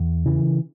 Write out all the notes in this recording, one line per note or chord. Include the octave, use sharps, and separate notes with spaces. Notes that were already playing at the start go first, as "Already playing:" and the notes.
Already playing: E2
C#3 E3